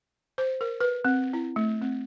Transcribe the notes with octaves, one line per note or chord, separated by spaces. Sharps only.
C5
A#4
B4
C4
E4
A3
C4